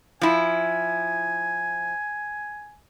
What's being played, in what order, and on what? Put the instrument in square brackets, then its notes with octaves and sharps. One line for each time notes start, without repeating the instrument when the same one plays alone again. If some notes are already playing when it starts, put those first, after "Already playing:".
[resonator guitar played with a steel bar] F3 E4 [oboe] G#5